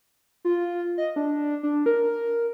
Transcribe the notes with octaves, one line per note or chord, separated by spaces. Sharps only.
F4
D#5
D4
D4
A#4